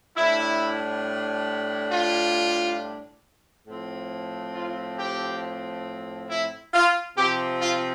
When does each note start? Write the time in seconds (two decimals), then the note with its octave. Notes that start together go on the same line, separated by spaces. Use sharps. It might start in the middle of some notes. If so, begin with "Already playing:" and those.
0.17 A2 G3 D4 E4
1.92 F4
3.68 A2 F3 C4
4.55 F4
4.99 G4
6.30 E4
6.74 F4
7.17 C3 F3 C4 G4
7.61 F4